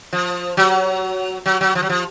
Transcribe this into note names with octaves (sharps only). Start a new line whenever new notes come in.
F3
F#3
F#3
F#3
F3
F#3
F3